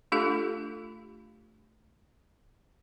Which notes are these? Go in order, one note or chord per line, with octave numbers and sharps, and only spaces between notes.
A3 D4 F4 G4 A4 F5